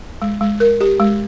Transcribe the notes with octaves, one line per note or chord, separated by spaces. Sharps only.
G#3
G#3
A#4
G4
G#3